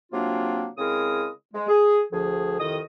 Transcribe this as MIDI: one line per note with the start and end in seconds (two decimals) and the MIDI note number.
0.12 0.67 48
0.12 0.67 54
0.12 0.67 58
0.12 0.67 60
0.12 0.67 62
0.12 0.67 65
0.77 1.28 49
0.77 1.28 56
0.77 1.28 60
0.77 1.28 64
0.77 1.28 70
0.77 1.28 87
1.54 1.66 56
1.67 2.01 68
2.12 2.60 38
2.12 2.60 53
2.12 2.60 68
2.60 2.79 36
2.60 2.79 41
2.60 2.79 51
2.60 2.79 75
2.60 2.79 87